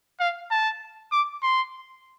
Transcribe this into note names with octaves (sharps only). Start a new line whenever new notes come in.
F5
A5
D6
C6